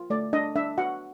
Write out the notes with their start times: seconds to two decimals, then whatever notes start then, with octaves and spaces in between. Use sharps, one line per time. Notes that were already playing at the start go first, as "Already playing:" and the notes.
Already playing: F4
0.10 A3 D5
0.33 D4 D#5
0.56 D4 E5
0.78 F#4 F#5